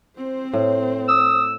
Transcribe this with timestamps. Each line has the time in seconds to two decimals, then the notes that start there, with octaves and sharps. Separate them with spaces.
0.17 C4 C5
0.53 A2
1.08 D#6 E6